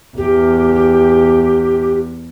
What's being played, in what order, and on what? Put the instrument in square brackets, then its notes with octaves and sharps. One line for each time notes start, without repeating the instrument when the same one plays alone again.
[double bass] E2 [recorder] G4